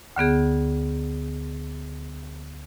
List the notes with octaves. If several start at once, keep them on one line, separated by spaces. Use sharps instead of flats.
D2 D3 B3 G#4